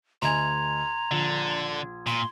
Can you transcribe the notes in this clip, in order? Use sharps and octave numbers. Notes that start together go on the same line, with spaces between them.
D2 D#5 G#5 A#5 C6 G#6
A#1 D3
A#2 C6